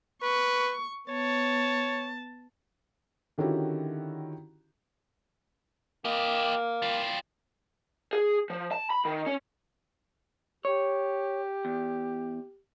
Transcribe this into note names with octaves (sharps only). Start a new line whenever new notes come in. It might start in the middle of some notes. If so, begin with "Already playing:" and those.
B4 C#6
B3 C#5 A5
D3 D#3 C#4 E4 F#4 G4
A#3 G4 D#5
G3 F4
G#4
F3
A5
B5
D#3
C#4
G4 C#5
E2